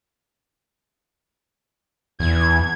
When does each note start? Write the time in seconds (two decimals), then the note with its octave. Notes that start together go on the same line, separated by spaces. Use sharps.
2.20 E2 G#6